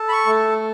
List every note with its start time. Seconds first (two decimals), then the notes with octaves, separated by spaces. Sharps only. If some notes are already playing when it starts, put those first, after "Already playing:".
Already playing: A4
0.09 B5
0.12 C#6
0.26 A3